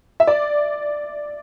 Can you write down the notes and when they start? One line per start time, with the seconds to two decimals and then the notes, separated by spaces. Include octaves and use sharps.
0.20 E5
0.27 D5